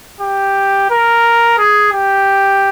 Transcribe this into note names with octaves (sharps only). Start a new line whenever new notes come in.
G4
A#4
G#4
G4